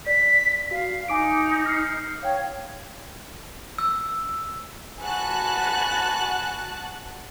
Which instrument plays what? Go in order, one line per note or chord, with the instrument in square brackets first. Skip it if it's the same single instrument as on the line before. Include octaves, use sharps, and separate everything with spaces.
[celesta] D5 [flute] B6
[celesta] F#4 [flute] F5
[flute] D#4 [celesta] G#5 D6 D7
[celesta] F6 C7
[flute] C#5 [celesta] F5 G5
[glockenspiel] E6
[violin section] F#4 A5 F#6 [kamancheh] G#5 B5